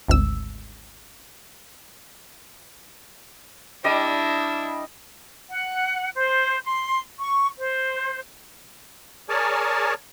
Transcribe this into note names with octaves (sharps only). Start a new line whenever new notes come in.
G#1 D2 E6
G3 D4 E4 D#5
F#5
C5
C6
C#6
C5
G#4 A#4 C#5 D5 G#5 A5